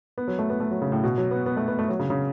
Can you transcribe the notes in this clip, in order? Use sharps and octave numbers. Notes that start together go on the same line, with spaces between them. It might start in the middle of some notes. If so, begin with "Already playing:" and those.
B3
F#3
A3
B3
A3
F#3
C#3
A2
B2
F#3
B3
B3
A3
B3
A3
F#3
C#3
C#3